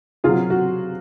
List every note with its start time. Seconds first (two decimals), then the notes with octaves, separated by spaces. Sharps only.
0.24 C3 F#3 F4 G#4
0.50 F#4